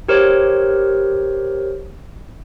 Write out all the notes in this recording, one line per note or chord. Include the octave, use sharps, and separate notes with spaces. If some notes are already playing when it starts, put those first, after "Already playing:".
G4 A#4 C5 C#5